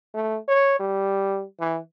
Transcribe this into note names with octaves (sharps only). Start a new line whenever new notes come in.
A3
C#5
G3
E3